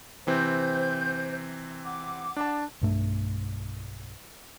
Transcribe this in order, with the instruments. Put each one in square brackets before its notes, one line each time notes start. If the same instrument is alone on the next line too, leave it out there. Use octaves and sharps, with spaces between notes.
[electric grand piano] C3 E3 C4 [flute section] C5 G6
[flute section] F#5 D6
[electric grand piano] D4 A5
[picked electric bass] B1 G2 A3